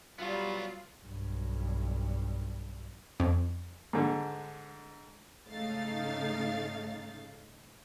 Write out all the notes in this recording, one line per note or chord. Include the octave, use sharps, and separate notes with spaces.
F#3 G3 B3 F4
B1 G2
F2
G#2 D3
G#2 C#3 A3 D#4 F5 A6